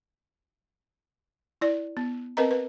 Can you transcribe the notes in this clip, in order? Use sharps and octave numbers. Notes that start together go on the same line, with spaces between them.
E4 D5
B3
C4 A#4 B4 D#5 A#5
B4